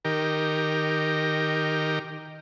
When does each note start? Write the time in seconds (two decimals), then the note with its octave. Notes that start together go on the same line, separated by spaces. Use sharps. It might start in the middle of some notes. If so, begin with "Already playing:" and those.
0.05 D#3 G4 A#4